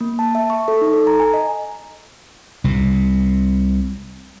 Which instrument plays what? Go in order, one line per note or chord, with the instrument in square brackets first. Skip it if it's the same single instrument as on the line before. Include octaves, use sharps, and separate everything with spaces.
[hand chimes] A#3
A5
E5
C#6
A4
D#4
A4
A#5
G#5
D#5
[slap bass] C2 C3